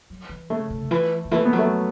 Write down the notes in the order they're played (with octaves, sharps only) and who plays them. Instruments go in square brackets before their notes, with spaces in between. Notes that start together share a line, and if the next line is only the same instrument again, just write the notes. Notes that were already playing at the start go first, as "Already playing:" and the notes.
[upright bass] F#3
E3
[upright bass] C#3 [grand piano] A3
[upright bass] C#3
C#3
E3
C#3
[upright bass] E3 [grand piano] A3
[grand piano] B3
[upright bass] F#3
[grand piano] A3